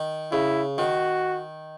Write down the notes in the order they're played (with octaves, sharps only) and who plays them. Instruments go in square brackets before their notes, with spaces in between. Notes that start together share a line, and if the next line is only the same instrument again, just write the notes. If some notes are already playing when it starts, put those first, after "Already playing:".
Already playing: [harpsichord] D#3
[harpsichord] C#3 [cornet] E4
[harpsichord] D#3 [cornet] F#4